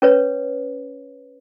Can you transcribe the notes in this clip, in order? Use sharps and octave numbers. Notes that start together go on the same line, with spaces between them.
C#4 B4 C#5